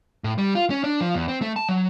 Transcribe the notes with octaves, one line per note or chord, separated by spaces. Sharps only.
A2
G3
F4
C#4
D4
F3
E2
C4
A3
A5
F#3